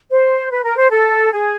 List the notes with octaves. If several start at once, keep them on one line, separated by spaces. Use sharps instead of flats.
C5
B4
A#4
C5
A4
G#4